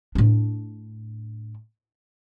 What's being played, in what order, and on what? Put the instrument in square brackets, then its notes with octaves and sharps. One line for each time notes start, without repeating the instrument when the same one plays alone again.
[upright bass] A2 D4